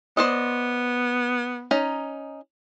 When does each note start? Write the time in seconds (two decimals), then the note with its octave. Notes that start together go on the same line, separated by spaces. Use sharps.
0.17 B3 C5 D5 D#5
1.71 C#4 D#4 A#5